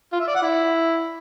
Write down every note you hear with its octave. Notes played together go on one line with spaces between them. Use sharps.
F4
E5
D5
F#5
E4